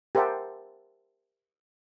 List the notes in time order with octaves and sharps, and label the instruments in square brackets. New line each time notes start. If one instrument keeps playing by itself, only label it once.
[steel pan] G4 A#4 C5 E5 F#5 A5